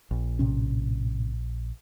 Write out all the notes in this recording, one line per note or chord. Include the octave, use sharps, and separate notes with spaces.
A#1
A2 C3 C#4